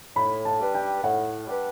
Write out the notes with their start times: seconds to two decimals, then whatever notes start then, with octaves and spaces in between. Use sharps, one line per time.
0.16 A2 B5
0.45 A5
0.60 G3 D4 G4 B4
0.75 G5
1.03 A2 F#5
1.47 G3 D4 G4 B4